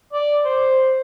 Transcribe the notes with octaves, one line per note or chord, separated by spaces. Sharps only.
D5
C5